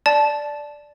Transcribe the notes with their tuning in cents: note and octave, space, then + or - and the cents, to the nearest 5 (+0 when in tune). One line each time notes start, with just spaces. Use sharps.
D5 +0 A5 -15